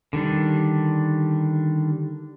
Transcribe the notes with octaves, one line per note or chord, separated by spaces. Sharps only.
D3 D#3 G3 D4